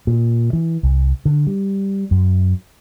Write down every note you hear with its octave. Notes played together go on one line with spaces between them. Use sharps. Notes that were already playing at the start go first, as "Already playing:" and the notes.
A#2
E3
C2
D3
G3
F#2